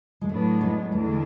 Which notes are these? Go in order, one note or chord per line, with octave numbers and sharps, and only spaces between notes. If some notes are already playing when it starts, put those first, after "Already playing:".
G#3
A2 F#3 A3 B3 D4
G#3
E2 D3 G#3 A3 D4